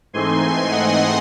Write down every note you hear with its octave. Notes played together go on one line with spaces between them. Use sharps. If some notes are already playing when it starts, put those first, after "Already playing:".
G#2 E3 A3 C4 D#4 G#5 C6
D#5 F#5